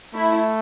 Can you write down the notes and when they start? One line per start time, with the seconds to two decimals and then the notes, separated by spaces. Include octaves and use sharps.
0.14 A3 E4